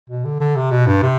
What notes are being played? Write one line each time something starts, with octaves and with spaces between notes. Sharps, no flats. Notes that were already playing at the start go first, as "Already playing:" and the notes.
B2
D3
D3
C3
B2
G2
C3